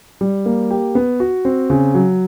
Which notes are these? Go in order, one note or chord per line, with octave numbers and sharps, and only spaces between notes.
G3
A#3
G4
B3
F#4
C4
C#3
F#3